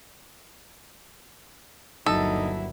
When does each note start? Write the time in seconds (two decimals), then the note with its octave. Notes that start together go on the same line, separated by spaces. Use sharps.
2.06 G1 D#2 F#3 D#4 E4 A4